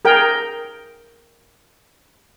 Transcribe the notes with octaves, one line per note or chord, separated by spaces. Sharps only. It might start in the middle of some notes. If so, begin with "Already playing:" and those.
G#4 A#4 G5